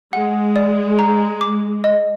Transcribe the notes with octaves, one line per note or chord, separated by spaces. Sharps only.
G#3 F#5
D5
A#5
D6
D#5